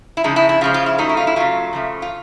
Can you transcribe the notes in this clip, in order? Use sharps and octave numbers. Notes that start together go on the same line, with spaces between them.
E4
C#3 F3 G#3 D#4
E4
E4
C#3 F3 G#3 F4
F4
E4
C#3 F#3 A3 D#4
E4
F4
E4
C#3 F#3 A3 F4
C#3 F3 A3
F4